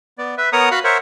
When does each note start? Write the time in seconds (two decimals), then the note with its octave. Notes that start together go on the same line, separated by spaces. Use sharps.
0.18 B3 D5
0.38 B4 E5
0.53 B3 A#4 C#5 F#5 A#5 D#6
0.71 F#4 F5 B5 F#6
0.84 A#4 C5 C#5 E5 F#5